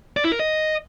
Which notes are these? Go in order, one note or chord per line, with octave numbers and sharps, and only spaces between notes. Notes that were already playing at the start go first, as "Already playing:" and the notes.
D5
E4
A#4
D#5